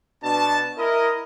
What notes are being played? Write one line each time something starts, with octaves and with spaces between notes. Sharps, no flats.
B2 D4 A5
E4 A#4 D#5